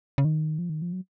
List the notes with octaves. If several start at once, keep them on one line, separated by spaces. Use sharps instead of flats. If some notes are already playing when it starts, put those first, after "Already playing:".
C#3
D#3
F3
D#3
F3
F#3